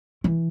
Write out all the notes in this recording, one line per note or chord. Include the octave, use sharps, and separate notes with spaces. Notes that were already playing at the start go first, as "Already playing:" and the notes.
E3